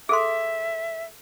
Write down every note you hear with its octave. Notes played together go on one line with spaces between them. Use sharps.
G#4 A4 E5 C6